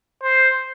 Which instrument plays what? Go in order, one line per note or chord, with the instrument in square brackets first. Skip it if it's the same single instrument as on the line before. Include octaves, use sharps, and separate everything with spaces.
[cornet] C5